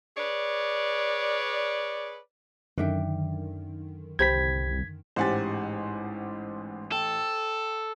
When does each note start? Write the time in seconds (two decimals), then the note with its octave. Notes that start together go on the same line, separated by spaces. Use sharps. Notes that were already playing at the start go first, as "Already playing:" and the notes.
0.17 G#4 B4 C#5 D5
2.78 F#2 D3 D#3 D4 E5 G5
4.19 C2 G4 C5 B5 G#6 B6
5.16 A1 G#2 G4 C5 F#5 G#5 A6
6.92 A4 G5